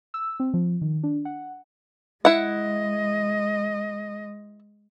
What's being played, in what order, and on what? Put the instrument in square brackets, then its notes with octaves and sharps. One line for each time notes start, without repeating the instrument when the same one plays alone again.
[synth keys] E6
C4
F3
D#3
D4
F#5
[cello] G#3 D#5 [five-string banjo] E4 F#5